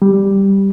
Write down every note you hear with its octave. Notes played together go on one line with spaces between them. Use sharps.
G3